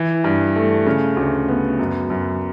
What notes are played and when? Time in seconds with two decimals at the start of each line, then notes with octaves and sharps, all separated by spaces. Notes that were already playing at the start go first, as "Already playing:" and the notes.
Already playing: E3
0.24 G2
0.56 A3
0.86 C#3
1.17 D2
1.48 B3
1.79 F#2
2.10 F#2